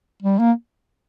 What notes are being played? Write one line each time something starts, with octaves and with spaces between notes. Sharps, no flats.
G3
A#3